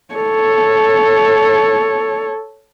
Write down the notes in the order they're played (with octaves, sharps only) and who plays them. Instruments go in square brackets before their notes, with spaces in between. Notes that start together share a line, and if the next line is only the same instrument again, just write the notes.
[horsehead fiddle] A4 C#5